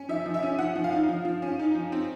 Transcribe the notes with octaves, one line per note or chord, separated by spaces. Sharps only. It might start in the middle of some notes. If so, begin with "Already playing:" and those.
Already playing: C#4
F3 E5
F3
E5
C#4
F3 F#5
F3
F5
D#4
F3
F3
C#4
D#4
F3
C4